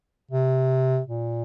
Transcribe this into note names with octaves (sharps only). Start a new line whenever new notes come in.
C3
A#2